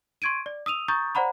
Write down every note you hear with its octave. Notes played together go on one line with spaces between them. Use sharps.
C6 C#6 G#6 D7 D#7
D5
D#6 E6 D#7 F7
A#5 C#6 D#6 G6 A6
C5 D5 F#5 A#5 B5